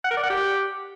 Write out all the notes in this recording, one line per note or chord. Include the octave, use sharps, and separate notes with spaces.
F#5
A#4
D5
F#5
G4